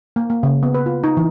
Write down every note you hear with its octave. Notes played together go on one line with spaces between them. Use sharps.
A#3
A#3
C#3
B3
B4
F4
D#4
E3